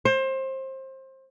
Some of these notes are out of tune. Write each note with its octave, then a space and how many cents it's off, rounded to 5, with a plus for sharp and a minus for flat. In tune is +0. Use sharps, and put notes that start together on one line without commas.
C5 +25